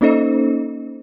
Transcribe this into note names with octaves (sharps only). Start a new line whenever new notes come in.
A#3 C#4 D#4 A4 C5 D#5